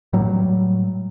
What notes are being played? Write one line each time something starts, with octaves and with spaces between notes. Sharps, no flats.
A2 F#3 G3